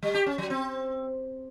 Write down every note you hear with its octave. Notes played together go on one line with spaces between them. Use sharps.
G3
G4
C#4
F#3
C4